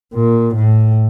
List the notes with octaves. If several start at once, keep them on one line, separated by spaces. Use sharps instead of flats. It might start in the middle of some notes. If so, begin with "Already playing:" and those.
A#2
A2